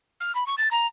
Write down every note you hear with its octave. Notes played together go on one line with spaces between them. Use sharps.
F6
B5
C#6
A6
A#5